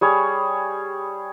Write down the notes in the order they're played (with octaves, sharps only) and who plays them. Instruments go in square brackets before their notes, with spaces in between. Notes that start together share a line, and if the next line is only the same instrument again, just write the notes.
[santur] G3 G#4 C#5